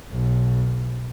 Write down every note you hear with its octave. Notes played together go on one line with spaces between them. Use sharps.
B1